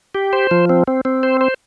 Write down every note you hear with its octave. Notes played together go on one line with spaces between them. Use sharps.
G4
C5
F3
C4
C4
C4
C5
C5